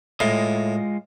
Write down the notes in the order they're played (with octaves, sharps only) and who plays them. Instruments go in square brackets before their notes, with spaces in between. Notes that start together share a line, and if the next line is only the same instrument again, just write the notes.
[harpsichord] A2 [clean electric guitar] G#3 F4 D#5